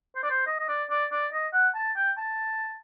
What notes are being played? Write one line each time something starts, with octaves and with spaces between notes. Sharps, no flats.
C5
D5
C5
D#5
D#5
D5
D5
D5
D#5
F#5
A5
G5
A5